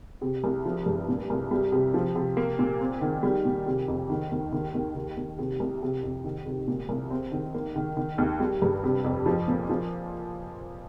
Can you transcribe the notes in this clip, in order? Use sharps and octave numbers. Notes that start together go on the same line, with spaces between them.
C3
C2
F3
G2
A#2
C2
G3
C3
F3
C3
A#3
A#2
C4
D#3
G3
A#2
C3
F2
D#3
D#2
D#3
D#2
D#3
D#2
C3
C2
C3
F2
D#3
C3
A#2
C2
C4
D#3
A#3
D#3
D#3
D#2
G3
G2
C3
F2
F3
A#2
F3